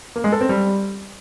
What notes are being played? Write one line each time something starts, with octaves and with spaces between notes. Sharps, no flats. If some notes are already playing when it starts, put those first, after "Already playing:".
A#3
G#3
A4
C4
G3